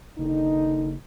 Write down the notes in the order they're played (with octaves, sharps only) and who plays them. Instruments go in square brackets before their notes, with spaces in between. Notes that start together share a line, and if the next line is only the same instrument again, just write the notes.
[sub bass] F#1 [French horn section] D3 D#3 D#4